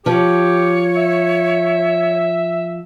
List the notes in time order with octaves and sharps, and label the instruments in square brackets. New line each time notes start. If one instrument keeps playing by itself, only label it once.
[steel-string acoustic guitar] F3 [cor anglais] G4 [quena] C#5
[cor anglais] E5